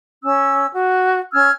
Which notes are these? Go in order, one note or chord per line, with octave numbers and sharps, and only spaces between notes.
C#4 E6
F#4
C#4 E6 F6 G#6